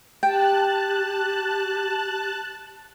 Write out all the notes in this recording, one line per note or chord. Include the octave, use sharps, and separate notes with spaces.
G4 G5 A5 F#6